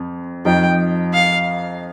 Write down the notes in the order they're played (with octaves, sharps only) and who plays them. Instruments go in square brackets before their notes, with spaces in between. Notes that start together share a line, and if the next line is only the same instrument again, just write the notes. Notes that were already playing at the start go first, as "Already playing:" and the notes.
Already playing: [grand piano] F2 C4
[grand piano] F2 F3 D#4 [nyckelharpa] G5
[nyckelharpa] F5